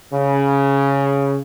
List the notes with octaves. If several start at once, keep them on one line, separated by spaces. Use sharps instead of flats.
C#3